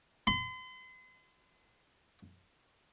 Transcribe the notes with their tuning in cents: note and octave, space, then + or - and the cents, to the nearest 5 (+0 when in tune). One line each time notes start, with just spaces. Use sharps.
C6 -40